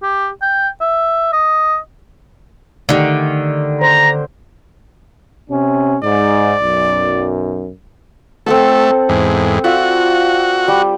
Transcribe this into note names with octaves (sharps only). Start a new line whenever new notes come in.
G4
G5
E5
D#5
D3 D#3 A3 D#4 G4
C5 A#5
C3 C#4
G#2 D5
B1 F#2
A3 C4 A4 F#5
E2 G#2
F4 F#4 D5 E5
G3